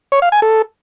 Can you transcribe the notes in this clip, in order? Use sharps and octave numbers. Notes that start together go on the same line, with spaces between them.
C#5
F5
G#5
A4